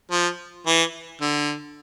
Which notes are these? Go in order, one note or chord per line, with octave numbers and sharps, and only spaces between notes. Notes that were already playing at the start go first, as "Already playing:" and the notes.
F3
E3
D3